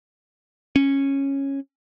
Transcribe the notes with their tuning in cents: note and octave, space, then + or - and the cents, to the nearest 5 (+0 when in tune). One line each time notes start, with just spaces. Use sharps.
C#4 -10